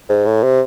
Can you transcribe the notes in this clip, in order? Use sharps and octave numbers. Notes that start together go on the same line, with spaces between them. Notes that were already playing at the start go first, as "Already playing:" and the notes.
G#2
A2
C3